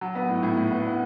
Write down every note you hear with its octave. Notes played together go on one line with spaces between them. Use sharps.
F#3
B3
A2
A2
A2
B3
B3